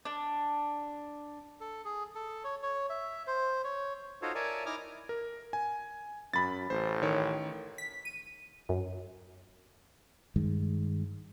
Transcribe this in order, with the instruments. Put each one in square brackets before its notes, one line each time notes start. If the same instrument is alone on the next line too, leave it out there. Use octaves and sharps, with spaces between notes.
[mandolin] D4
[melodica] A4
G#4
A4
C#5
C#5
E5
C5
C#5
[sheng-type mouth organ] D#4 F4 F#4 A4 C5 C#5
A#4 C#5 D5 E5 G#5 A5
D#4 E4 G#5 D6 D#6 F6
[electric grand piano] A#4
G#5
[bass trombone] F#2 [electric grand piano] B5 A6
[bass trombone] A1 [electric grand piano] C5
[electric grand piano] D#3 C#5
[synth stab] B6
D#7
F#2
[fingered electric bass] G2 D#3 G#3